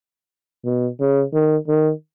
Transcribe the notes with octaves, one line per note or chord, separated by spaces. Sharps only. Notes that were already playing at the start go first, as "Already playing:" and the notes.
B2
C#3
D#3
D#3